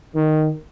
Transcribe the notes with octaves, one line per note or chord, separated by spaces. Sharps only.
D#3